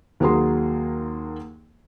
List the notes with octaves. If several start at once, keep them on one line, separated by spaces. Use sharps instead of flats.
D#2 F#3 A#3 G#4 C6